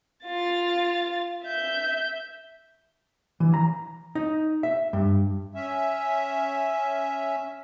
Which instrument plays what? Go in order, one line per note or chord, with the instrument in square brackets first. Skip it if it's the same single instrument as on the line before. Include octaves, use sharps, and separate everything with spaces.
[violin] F4 A6
E5 G6
[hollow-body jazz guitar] E3
A#5
D#4
E5
G2
[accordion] C#4 E5